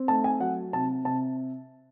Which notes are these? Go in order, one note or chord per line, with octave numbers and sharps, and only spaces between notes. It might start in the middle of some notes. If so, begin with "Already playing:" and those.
Already playing: C4
A3 A5
G#5
F#3 F#5
C3 A5
C3 A5